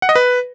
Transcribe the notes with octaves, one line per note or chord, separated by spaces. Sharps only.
F#5
D#5
B4